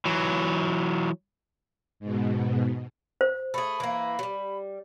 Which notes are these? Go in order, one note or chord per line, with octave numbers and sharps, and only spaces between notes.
E3 F#3
G#2 B2
C5
A3 G#4 B5
E3 A#3
F#3 G3